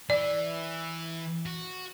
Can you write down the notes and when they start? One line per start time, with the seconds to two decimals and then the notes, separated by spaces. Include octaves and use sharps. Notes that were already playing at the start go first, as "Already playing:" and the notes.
0.10 E3 D5
1.46 F#4